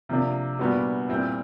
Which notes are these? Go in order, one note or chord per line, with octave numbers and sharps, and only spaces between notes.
C3 F3 A#3 D4
A#2 G3 B3 D4 F#4
A#2 G3 C4 E4